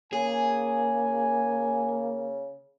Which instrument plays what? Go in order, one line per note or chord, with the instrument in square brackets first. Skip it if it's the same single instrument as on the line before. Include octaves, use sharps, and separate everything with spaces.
[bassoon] C#3 [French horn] A#3 [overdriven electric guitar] G#4 [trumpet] G#5